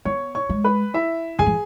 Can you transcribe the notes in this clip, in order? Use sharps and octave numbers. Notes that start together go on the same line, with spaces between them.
B3 C#5 C#6
C#5 C#6
G#3
B4 B5
E4 E5
D3 G#4 G#5
E3